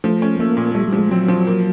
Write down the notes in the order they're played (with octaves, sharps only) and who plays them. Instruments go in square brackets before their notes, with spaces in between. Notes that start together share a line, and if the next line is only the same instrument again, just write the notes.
[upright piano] F3 [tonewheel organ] A3
[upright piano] C#4
[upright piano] A3 [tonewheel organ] A#3
[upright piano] A#2
[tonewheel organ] G3 [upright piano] A3
[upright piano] F3 [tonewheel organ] G3
[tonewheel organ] G#3
[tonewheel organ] F#3 [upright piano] C4
[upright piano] F3
A#3